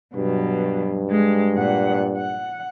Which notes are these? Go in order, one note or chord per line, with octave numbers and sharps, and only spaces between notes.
G2 B2 F#3
G#3
A#2 F#5
F#5